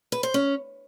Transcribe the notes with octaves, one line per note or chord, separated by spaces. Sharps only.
B4
C5
C#4